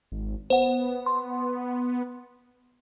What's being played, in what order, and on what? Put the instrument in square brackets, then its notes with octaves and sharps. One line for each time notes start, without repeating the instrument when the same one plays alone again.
[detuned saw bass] G#1
[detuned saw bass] B3 [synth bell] C5 F#5
[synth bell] C6